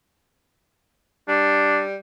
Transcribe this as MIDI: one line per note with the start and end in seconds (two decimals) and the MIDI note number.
1.28 1.96 55
1.28 1.81 62